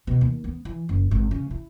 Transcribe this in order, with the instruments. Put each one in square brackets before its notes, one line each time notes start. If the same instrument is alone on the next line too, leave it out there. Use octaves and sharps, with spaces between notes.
[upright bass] B2
D#2
B3
E3
F#1
G#1
C#3
E4